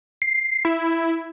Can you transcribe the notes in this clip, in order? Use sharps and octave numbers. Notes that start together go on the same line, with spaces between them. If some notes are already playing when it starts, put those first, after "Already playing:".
C7
E4